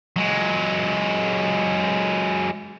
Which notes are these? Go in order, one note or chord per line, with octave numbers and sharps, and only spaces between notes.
F#3 G#3